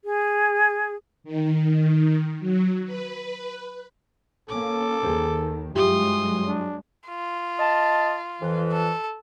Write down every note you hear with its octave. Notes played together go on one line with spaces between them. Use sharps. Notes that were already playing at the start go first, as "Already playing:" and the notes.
G#4
D#3
F#3
B4
A#3 C#4 A4 D6
D#2 D#3 G#4 C5
G2 F#3 G#3 E4 F4 G4 C6 D#6
D4
F4
D#5 A5
F2 E3
A4